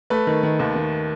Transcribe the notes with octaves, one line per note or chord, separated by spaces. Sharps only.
A3 B4
D#3
D#3
D#2
D#3